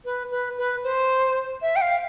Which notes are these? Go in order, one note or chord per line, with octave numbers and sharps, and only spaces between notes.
B4
B4
B4
C5
E5
G5
F5